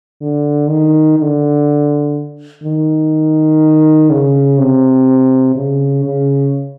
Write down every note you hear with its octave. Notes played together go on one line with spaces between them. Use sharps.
D3
D#3
D3
D#3
C#3
C3
C#3
C#3